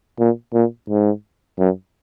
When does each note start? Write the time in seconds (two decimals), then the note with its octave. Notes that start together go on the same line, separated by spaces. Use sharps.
0.19 A#2
0.54 A#2
0.90 G#2
1.59 F#2